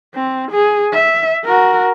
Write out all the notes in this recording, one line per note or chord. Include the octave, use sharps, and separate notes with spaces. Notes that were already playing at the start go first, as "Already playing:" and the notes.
C4
G#4
E5
F#4 A#4